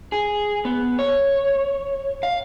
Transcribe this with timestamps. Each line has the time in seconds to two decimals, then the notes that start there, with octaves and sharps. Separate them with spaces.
0.12 G#4
0.65 B3
0.99 C#5
2.23 F5